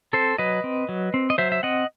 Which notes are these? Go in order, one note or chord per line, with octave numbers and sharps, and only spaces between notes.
C4 A4 C5
F#3 B4 D#5
C4
F#3
C4
D#5
F#3 C5 E5
E5
C4 D#5 F#5